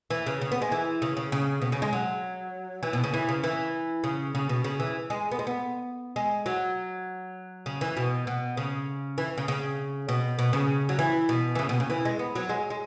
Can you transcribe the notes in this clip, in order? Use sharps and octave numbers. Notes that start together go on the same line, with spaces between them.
E3
C#3
C#3
B3
G#3
E3
C#3
C#3
C#3
B2
C#3
G#3
F#3
E3
B2
C#3
E3
C#3
E3
C#3
C#3
B2
C#3
E3
G#3
B3
G#3
B3
G#3
F#3
C#3
E3
B2
B2
C#3
E3
C#3
C#3
B2
B2
C#3
F#3
E3
B2
E3
C#3
B2
C#3
E3
G#3
B3
F#3
G#3
G#3